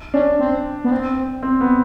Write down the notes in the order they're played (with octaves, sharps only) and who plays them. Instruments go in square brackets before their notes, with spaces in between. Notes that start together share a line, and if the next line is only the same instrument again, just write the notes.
[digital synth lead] C#4 [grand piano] D4
[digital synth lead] C4
B3
C4
[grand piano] C4
B3